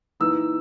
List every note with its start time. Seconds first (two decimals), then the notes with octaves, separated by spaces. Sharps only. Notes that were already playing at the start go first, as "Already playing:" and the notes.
0.20 E3 A#3 D#4 E6